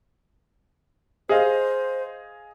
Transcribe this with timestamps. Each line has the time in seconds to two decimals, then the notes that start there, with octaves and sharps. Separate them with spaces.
1.29 G#4 C5 D#5 F5